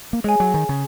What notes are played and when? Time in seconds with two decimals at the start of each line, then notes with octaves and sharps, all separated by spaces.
0.13 A#3
0.24 G#3 G#4 C#5 G#5
0.40 F#3
0.54 D#3
0.69 C#3